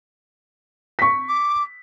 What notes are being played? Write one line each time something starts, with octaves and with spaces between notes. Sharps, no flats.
C#6 B6
D6